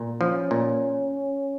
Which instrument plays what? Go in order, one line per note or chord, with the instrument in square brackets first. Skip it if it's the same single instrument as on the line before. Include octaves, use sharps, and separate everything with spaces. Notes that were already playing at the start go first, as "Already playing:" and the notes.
Already playing: [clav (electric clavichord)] A#2
[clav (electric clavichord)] F3 [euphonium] C#4
[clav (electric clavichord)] A#2